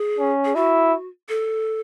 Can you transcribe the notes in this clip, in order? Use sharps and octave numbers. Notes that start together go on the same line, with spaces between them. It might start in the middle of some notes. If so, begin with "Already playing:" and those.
Already playing: G#4
C#4
G#4
E4 F#4
A4